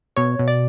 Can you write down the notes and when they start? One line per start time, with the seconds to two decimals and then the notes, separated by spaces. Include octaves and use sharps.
0.17 B2 C#5
0.39 B2
0.48 D5